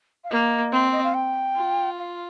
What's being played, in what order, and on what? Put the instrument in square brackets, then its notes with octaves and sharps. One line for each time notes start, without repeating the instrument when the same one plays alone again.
[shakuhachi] F5
[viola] A#3 [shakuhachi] D#5
[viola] C4
[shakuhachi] D#5
F5
G5
[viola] F4
[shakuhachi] F5